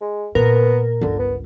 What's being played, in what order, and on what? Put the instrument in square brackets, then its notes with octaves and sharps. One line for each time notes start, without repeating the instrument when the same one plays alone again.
[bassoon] G#3
[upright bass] A#2 [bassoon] B3 [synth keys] A#4
[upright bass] G1 C#2 [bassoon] D3
[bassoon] B3